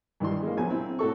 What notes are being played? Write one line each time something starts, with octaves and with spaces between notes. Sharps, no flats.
G2 D#3 E3 G3 C6
G#3 A#3
A#1 F#3 B3 G#5
C4 E4
A2 F#4 A4 C#6